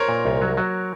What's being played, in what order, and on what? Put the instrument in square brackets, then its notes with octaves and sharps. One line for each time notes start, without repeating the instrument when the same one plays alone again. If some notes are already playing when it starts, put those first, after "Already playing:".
Already playing: [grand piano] A#4 C5 C#5
[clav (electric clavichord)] A#2
C2
F#3
F#3